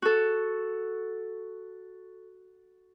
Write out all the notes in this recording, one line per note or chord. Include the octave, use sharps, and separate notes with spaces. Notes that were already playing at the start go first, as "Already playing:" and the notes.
F#4 A4